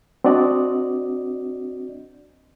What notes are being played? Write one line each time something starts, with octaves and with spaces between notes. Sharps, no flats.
C4 D4 F#4 D5 D#5